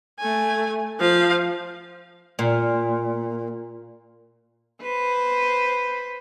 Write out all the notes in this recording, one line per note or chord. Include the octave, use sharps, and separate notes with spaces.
A3 G#5
F3 F5
A#2
B4 C5